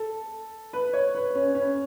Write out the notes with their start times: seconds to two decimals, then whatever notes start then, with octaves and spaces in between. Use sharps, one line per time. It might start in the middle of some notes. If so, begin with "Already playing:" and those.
Already playing: A4
0.73 B4
0.93 C#5
1.15 B4
1.35 C#4
1.55 C#4